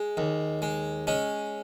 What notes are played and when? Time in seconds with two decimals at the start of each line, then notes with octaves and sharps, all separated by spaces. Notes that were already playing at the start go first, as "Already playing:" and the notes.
Already playing: G#3
0.17 D#2
0.62 G#3
1.07 G#3 C#4